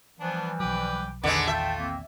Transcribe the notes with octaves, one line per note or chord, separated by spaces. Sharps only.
E3 F3 G3 B3 D4
B1 F#3 B4 G5 D6
A#1 E2 D3 D#3 G#3 B4 D6
A3 F4 E5 G5 A5
A#3 C4